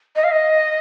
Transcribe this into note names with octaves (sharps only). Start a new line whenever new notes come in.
D#5
F5
D#5